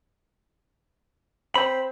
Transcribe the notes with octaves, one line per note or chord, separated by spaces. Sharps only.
C4 C5 B5